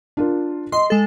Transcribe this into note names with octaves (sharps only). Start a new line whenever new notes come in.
D4 F4 A#4
D#5 C6
G#3 A4